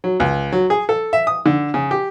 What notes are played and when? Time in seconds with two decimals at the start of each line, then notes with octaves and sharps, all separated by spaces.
0.04 F#3
0.20 C#2
0.52 F#3
0.70 G#4
0.89 A4
1.13 E5
1.27 D#6
1.46 D3
1.74 C#3
1.91 G4